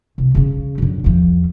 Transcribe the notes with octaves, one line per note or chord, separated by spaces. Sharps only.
C2
C#3 C#4
F#2 D3
E2 F3